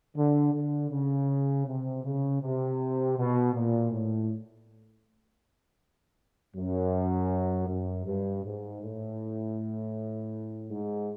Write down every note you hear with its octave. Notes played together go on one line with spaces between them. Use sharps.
D3
D3
C#3
C3
C#3
C3
B2
A#2
A2
F#2
F#2
G2
G#2
A2
G#2